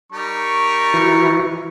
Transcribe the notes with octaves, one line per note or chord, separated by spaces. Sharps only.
G3 D#4 A#4 C#6
E3 E4 F#4